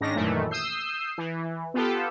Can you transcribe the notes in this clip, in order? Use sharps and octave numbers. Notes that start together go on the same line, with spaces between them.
G#2 D#3 C#4 D4 A#6
F#2 A#2 D#3 E3 A3
D#6 E6 G6 C7
E3
B3 F4 G4 A4